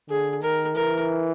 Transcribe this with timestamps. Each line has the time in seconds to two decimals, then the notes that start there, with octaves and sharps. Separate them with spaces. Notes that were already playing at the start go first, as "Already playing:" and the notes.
0.09 D3 G#4
0.42 D#3 A#4
0.76 E3 A#4